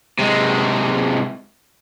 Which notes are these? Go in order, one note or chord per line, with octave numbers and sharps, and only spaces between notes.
C3 G#3